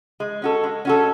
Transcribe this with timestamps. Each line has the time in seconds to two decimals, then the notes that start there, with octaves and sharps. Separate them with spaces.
0.20 G#3
0.42 C#4 F#4 A4
0.63 G#3
0.85 C#4 F#4 A4